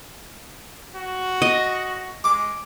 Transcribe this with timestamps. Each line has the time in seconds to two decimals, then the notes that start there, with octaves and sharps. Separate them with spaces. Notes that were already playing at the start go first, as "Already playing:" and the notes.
0.96 F#4
1.42 D#5
2.24 G#3 D6